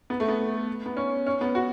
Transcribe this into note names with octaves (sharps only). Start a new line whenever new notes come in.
B3
A3
B3
B3
C#4
C#4
B3
F#4